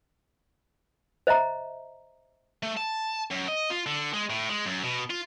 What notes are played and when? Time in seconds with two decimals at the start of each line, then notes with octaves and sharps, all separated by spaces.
1.27 C5 D#5 E5 A#5
2.63 A3
2.77 A5
3.31 F#2
3.48 D#5
3.70 F4
3.86 D3
4.14 G#3
4.30 A2
4.49 G#3
4.66 F#2
4.83 B2
5.10 F4